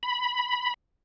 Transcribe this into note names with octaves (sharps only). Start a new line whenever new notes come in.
B5